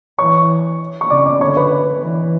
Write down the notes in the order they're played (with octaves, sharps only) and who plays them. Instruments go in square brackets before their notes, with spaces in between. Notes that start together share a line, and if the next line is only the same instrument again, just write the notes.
[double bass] E3 [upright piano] C#5 C#6
[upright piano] C#6
[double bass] C#3 [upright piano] D5 D6
[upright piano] D5 D6
[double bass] D3 [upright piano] C#5 C#6
[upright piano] B4 B5
[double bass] E3